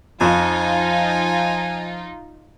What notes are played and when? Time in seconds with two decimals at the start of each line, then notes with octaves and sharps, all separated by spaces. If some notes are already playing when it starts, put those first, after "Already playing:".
0.21 F2 F3 D#4 F4 G#5